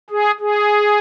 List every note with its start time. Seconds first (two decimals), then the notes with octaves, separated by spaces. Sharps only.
0.10 G#4
0.40 G#4